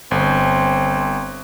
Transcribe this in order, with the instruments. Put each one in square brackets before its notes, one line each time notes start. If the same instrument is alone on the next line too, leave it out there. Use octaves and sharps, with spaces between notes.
[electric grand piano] G1 [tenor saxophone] C4